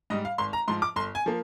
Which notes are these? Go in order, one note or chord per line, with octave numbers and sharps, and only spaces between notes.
G#2 G3 D#5
F5
G#1 C6
A#5
G#2 F3 C6
D6
G1 C6
G#5
F3 A#3